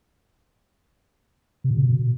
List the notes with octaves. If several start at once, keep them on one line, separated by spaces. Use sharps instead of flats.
C3
A#2
C#3
B2